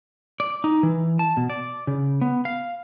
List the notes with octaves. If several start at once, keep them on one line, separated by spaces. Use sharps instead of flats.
D5
D#4
E3
A5
B2
D5
C#3
B3
F5